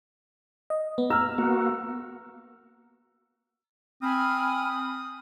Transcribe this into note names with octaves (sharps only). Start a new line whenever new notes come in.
D#5
B3
A#5 E6 F6
A#3 B3 F#4
C4 G#5 B5 D#6 F6